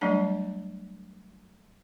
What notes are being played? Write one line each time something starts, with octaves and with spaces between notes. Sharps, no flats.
F#3 G3 A3 D4 A5